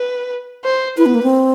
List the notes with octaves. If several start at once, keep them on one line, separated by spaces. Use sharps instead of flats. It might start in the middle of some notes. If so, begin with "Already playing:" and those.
Already playing: B4
C5
E4 B4
B3
A#3
C4